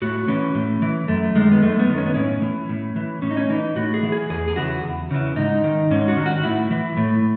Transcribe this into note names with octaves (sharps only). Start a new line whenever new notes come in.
A2 F#4
E3 C#4
A2
E3
F#2 A3
D#3 G#3
B3
F#2 A3
B3
D#3
C#4
B3
A2 C#4
E3
A2
E3
A2 C#4
D#4
C#4
E3 D#4
A2 F#4
G#4
E3
G#4
E2 G#4
G#4
C#3 E3 F#4
E2
C#3 E3
G#2 D#4
D#3
G#2 C#4
F#4
D#3
F#4
A2 E4
E3
A2